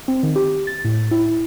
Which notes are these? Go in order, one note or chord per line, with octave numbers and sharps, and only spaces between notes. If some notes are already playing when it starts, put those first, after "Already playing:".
C4
D#3
G4
A6
A2
E4